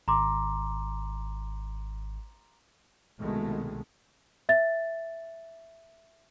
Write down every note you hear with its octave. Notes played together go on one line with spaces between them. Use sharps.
G#1 A#5 C6 D6
C2 B2 D#3 G#3 A3
E5 A6